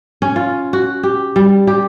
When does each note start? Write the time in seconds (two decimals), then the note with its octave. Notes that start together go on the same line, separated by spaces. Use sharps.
0.22 C#4
0.36 F4
0.73 F#4
1.03 G4
1.36 G3
1.67 G4